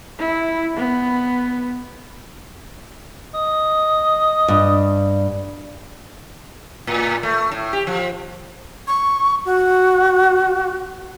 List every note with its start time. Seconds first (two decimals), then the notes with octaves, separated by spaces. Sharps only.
0.18 E4
0.76 B3
3.34 D#5
4.48 G2
6.87 A2
7.23 A3
7.51 A2
7.73 G4
7.87 F3
8.87 C#6
9.45 F#4